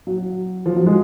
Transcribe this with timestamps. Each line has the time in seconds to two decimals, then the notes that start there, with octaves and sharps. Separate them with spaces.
0.07 F#3
0.66 F3
0.76 F#3
0.86 G#3